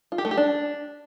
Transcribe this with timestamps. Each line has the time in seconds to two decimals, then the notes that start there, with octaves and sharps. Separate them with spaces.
0.12 F4
0.18 G4
0.25 A3
0.31 G4
0.37 D4